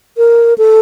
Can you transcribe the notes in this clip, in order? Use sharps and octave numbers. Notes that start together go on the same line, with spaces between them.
A#4
A4